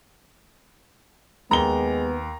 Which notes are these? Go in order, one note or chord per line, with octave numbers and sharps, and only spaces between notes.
D#2 G#3 B3 A#5 G7